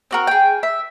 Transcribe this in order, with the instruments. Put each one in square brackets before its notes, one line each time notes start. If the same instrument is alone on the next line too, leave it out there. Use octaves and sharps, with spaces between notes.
[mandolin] C4 F#4 A#4
G#4 G5
E5